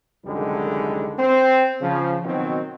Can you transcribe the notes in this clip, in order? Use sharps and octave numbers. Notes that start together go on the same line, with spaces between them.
C2 F#2 D3 D#3 G3 G#3
C4 C5
C#3 F3
B2 D#3 F#3 C4